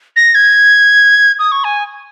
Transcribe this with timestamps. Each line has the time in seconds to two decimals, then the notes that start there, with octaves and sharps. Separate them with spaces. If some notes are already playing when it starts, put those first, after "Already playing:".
0.16 A#6
0.35 G#6
1.39 D#6
1.52 C#6
1.64 G#5